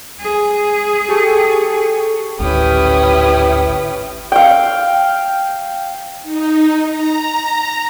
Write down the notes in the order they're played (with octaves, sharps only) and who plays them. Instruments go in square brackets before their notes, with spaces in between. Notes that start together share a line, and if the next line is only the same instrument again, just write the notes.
[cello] G#4
[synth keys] G4 A4 C#6
[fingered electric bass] G#1 D2 A2 [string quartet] C#4 E4 B4 [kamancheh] G4 D#6
[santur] F5 G5
[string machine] D#4
A#5